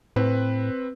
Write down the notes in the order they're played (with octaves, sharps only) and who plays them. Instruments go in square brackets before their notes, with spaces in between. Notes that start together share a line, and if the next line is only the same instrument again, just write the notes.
[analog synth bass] A2 [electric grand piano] C4 B4